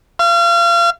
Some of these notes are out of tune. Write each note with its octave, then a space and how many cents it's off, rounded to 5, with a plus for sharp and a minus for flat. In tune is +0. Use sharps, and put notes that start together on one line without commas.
F5 -35